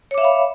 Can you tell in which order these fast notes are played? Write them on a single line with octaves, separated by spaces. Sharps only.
C#5 D6 E5 F5 B5